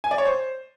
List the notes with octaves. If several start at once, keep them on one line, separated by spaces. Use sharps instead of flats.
G#5
D5
C#5
C5